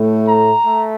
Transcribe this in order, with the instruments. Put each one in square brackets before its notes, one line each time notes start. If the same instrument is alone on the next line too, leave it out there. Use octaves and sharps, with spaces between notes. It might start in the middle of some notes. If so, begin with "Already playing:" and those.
Already playing: [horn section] A2 A3
A#5
A3